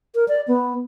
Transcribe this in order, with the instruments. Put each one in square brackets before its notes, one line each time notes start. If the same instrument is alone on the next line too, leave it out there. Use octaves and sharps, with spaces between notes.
[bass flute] A#4
D5
B3